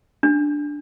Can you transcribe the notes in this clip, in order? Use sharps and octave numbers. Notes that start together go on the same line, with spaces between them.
D4